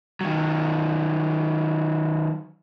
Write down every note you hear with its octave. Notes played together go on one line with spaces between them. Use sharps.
D#3 F#3